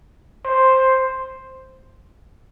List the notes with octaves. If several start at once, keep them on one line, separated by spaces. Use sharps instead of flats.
C5